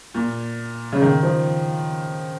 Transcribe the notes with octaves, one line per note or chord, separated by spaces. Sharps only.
A#2
C#3
D#3
F3